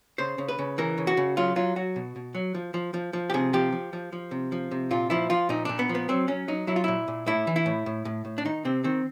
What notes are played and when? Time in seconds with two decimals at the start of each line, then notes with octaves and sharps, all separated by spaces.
0.18 C#3 C5
0.38 C#3
0.48 B4
0.59 C#3
0.78 E3 A#4
0.98 C#3
1.07 F#4
1.17 C#3
1.37 F#3 F4
1.56 F#3 F4
1.76 F#3 F#4
1.96 B2
2.16 B2
2.35 F#3
2.55 F3
2.74 F3
2.94 F3
3.13 F3
3.30 G4
3.34 C3 G#4
3.53 F3 G4
3.72 F3
3.93 F3
4.12 F3
4.31 C3
4.52 F3
4.71 C3
4.91 A#2 F4
5.10 F3 E4
5.30 F3 F4
5.49 A#2 D#4
5.65 A#2 D4
5.79 B3
5.89 F3
5.95 B3
6.09 F#3 C4
6.28 F#3 C#4
6.48 F#3 D#4
6.67 F#3 E4
6.76 F4
6.84 A#2 E4
7.08 A#2
7.26 A2 E4
7.47 E3
7.56 E4
7.66 A2
7.86 A2
8.05 A2
8.25 A2
8.38 D4
8.45 D#3 D#4
8.65 C3 C4
8.84 D#3 C4